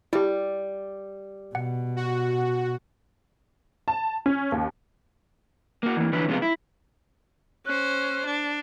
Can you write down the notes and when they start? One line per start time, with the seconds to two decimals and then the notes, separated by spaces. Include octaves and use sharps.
0.13 G3 E4 G4
1.55 B2 F#5
1.96 F#4
3.88 A5
4.26 C#4
4.52 D#2
5.83 A#3 F#4
5.97 E3 A#3
6.13 D3 E3 F3 C#4 B4
6.28 C3 F3 G#3 B3 F4
6.42 E4
7.66 C#4 C5 F#6
8.26 D4